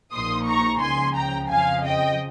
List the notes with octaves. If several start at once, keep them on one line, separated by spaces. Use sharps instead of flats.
A#1 A#2 F3 A#3 D#4 C6 D#6
A#5 C#6
C#2 C#3 F3 G#5 C6
G5 A#5
F2 C#3 F3 F5 G#5
D#5 G5